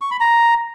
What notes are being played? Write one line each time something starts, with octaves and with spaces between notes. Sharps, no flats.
C#6
B5
A#5